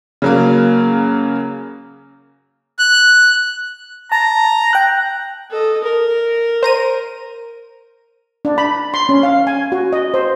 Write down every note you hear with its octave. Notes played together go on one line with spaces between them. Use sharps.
C#3 F#3 A#3
F#6
A5 A#5
G5 F#6
A4 D#5
A#4
C5 A#5 D#7
D4
B5
C6
C#4
F5
G#5
F#4
D#5
C5